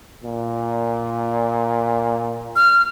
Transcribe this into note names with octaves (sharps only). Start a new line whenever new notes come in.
A#2
F6